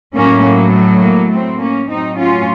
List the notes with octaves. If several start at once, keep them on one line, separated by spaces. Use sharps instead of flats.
A2 F#3 A#3 C#4
A#3
A3
A#3
A3 C4
A#3 C#4
A2 F#3 C4 D#4
C#4 F4